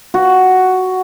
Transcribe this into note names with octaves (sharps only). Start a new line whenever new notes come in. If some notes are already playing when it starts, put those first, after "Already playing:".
F#4